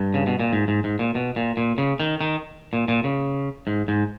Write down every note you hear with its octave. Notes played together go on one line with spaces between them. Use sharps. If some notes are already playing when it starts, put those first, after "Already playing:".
Already playing: G2
C#3
B2
A#2
G#2
G#2
G#2
A#2
B2
A#2
A#2
C#3
D#3
D#3
A#2
A#2
C#3
G#2
G#2